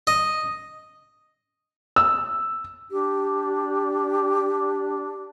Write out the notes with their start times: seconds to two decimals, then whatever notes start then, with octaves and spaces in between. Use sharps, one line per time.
0.07 D#5
1.96 E6
2.91 D4 G4